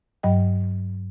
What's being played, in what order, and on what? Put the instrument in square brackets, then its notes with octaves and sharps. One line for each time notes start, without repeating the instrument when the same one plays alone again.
[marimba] G2 F#3 D#5 G5